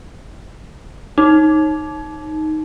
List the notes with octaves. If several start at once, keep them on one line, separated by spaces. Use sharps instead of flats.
D#4